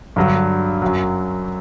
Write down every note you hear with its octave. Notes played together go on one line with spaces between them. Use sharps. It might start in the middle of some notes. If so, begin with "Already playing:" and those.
G2 D3 F#3
F#2 F#3